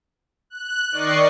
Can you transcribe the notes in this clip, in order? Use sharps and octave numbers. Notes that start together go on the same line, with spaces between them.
F#6
D#3 D5 D#5 C#6 C7